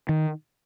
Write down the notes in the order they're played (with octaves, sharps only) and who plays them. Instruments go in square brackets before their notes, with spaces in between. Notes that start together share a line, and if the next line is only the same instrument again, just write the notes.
[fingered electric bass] D#3